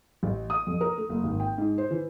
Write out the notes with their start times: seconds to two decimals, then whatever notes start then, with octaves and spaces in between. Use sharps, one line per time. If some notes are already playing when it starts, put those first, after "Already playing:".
0.23 A1
0.50 D#6
0.67 F2
0.81 A#4
0.98 A3
1.09 F#1
1.24 G#1
1.40 G5
1.58 G#2
1.78 C5
1.91 E3